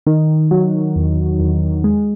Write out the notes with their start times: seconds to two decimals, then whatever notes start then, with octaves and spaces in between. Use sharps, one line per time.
0.07 D#3
0.51 F#3
0.96 E2
1.40 E2
1.84 G#3